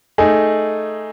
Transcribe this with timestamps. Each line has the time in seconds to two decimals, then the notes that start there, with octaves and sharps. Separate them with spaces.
0.18 A3 D#4 G#4